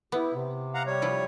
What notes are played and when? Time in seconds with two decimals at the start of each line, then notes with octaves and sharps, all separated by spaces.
0.12 B3 E4 G4
0.33 C3
0.75 F5 F#5 A#5
0.86 G3 C#5
1.02 F3 E4 F4